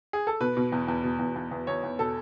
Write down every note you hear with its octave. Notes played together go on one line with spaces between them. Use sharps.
G#4
A4
B2 B4
B2
E2
E2
B2
E2
E2
E2
E2 C#5
E2
B2 A4